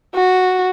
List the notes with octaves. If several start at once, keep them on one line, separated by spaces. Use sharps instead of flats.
F#4